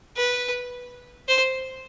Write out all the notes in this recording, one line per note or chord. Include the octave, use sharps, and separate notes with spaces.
B4
C5